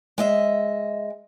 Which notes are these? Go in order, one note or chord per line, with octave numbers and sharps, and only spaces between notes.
G#3 D#5 E5